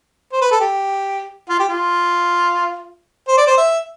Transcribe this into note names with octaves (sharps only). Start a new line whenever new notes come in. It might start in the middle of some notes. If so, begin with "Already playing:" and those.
C5
B4
A4
G4
F4
G4
F4
C5
D5
C5
E5